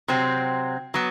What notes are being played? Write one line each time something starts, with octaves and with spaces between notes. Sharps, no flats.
C3 F#3 C4
F#3 B3